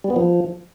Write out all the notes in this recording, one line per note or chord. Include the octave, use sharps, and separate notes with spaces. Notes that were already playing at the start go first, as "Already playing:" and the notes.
G3
B3
F3